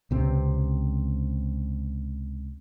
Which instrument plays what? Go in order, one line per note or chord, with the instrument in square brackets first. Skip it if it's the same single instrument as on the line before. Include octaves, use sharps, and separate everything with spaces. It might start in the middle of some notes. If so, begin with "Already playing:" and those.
[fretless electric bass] C#2 C3 C4